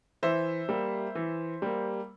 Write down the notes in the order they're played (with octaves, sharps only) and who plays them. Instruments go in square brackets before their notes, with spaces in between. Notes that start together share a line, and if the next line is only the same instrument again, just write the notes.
[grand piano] E3 C5 E5
G3 A#3
E3
G3 A#3